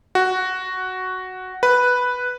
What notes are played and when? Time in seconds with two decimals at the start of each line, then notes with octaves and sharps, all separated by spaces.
0.15 F#4
1.63 B4